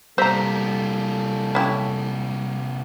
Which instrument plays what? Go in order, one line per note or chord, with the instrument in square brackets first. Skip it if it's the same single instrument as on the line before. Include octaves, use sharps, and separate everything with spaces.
[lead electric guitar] C3 A#3 [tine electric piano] G3 E6 B6 [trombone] A4 [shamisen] C5 A#5
[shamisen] C#4 E4 G4